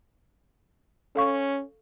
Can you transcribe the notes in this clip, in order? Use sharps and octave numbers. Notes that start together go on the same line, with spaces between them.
C#4 A4 F5 C#6